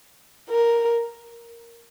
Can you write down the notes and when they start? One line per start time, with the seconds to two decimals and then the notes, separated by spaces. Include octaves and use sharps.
0.50 A#4